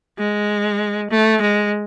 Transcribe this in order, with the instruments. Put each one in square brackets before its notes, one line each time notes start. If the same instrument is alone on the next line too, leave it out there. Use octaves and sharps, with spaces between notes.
[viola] G#3
A3
G#3